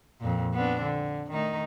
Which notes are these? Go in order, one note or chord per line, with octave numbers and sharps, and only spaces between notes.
F2 A#2
B3 C4 D4
D3
D#3 A3 D#4